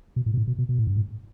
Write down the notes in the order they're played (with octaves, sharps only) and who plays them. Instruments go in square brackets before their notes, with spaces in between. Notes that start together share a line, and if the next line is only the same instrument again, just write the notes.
[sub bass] B2
A2
B2
A2
B2
B2
B2
A2
G2
A2